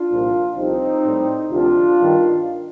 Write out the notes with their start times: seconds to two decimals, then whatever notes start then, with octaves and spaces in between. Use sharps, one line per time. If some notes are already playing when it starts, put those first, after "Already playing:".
Already playing: D4 F4
0.10 C2 A#2 F3
0.57 C2 C3 F3 C4 D#4
1.05 A2 G3
1.51 D2 C3 F3 D4 F4
1.99 G2 D#3 G3